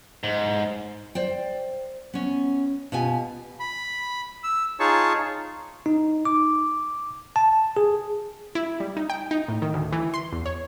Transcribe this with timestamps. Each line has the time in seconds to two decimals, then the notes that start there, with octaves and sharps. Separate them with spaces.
0.23 G#2
1.15 C5 D5 G5
2.14 B3 C#4
2.92 B2 F4 G4 G#5
3.60 B5
4.43 E6
4.80 D#4 F4 G#4 C#5 A5 C#6
5.86 D#4
6.25 D6
7.36 A5
7.77 G#4
8.55 E4
8.80 G3
8.97 D#4
9.10 G5
9.31 D#4
9.48 A2
9.62 D#3
9.74 D2
9.93 E3
10.14 C6
10.33 E2
10.46 C#5